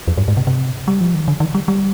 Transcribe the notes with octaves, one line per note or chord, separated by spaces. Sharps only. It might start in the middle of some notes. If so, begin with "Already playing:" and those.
F2
G2
G#2
C3
C3
G3
F3
D#3
D3
D#3
G3
G3